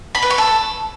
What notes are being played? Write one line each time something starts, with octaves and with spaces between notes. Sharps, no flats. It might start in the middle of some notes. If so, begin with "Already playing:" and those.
B5
B4
C#6
A4